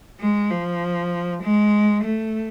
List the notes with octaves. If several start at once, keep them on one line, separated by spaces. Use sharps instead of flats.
G#3
F3
G#3
A3